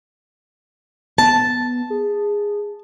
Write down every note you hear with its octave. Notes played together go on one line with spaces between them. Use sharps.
B3 A5
G#4